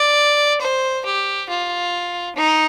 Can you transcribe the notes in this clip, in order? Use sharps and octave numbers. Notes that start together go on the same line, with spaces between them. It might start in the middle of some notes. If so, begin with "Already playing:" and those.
Already playing: D5
C5
G4
F4
D#4